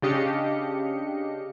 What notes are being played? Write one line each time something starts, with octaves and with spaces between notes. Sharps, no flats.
C#3 D4 G4 D#5 F5 C#7